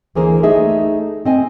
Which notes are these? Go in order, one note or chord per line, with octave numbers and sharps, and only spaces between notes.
D2 E3 A#3 G#4 A#4 C5
A3 D#4 G#4 D#5 E5
C4 D#5 G#5